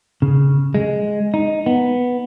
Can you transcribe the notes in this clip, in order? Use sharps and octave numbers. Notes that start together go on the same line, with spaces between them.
C#3
G#3
D#4
B3